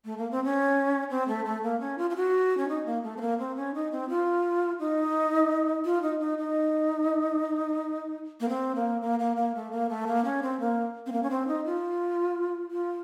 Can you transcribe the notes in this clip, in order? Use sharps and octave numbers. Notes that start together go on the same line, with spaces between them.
A3
A#3
C4
C#4
C4
A3
A3
A#3
C#4
F4
F4
F#4
C#4
D#4
A#3
A3
C4
A#3
C4
C#4
D#4
C4
F4
D#4
F4
D#4
D#4
D#4
A#3
C4
A#3
A#3
A#3
A#3
A3
A#3
A3
A#3
C#4
C4
A#3
C4
A#3
C#4
C4
D#4
F4
F4